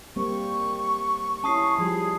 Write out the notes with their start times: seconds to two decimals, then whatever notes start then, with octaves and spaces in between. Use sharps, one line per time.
0.16 G3 A#3 C4 C#6
1.44 C#4 E4 A5 D#6 C7
1.79 F3 G3 G#4